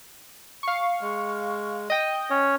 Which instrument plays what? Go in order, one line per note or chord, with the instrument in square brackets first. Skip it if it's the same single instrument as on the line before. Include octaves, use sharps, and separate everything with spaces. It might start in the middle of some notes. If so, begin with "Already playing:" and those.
[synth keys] F5 C#6
[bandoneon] G#3
[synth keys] D#5 G5
[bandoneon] C#4 C#5